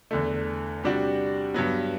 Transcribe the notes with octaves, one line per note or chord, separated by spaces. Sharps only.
E2 D3 A3
C3 G3 D4 F#4
G2 F#3 B3